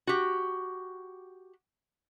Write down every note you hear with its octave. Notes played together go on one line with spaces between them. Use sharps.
F#4 G4